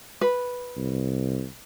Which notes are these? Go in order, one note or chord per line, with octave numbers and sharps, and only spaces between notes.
B4
C2